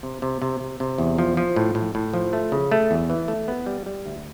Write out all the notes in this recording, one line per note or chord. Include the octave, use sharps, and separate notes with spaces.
C3
C3
C3
C3
C3
E2
F3
F3
A2
A2
A2
F3
A3
C#3
A3
E2
E3
A3
B3
G3
G3
D2